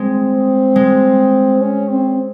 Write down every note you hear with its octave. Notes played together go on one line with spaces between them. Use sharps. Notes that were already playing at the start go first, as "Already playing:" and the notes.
Already playing: G#3 C4
G#3
C#4
C4